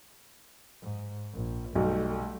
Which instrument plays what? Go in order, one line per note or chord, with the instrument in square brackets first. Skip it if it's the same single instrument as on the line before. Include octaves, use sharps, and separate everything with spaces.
[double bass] G#2
A#1
[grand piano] B1 [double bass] G3 A3